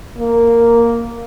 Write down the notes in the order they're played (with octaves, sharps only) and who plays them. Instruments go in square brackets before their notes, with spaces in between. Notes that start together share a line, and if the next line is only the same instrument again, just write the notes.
[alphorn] A#3